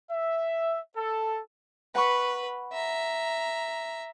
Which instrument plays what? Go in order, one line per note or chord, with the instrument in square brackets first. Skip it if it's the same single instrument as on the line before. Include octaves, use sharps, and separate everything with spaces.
[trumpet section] E5
A4
[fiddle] B4 [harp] F#5 B5 C#6
[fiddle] E5 A#5